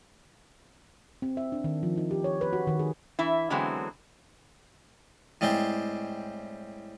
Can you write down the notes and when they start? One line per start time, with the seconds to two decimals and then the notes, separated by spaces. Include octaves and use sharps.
1.22 C4
1.37 E5
1.52 D4
1.64 D#3
1.83 F3
1.98 D#4
2.11 G4
2.24 C#5
2.41 B4
2.53 F#4
2.67 D#3
2.79 G#4
3.19 E3 E4
3.50 D3 E3 F#3 G#3 B3 C4
5.41 A2 G3 G#3 C4 G5